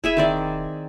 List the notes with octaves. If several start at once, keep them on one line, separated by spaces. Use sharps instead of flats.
E1 E4 G#4 E5
D#3 C4 D5